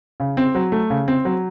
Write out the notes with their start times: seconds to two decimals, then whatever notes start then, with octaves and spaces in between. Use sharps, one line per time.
0.20 C#3
0.37 C4
0.55 F#3
0.72 A3
0.90 C#3
1.08 C4
1.25 F#3